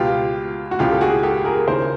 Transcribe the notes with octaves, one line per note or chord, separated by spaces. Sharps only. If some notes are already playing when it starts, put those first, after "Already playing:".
Already playing: C#2 B2 F4 G4
F#4
C#2 C#3 E3 F4 G4
A4
F#4 G#4
G4 A4
G#4 A#4
D#2 C#3 E3 A#4 C5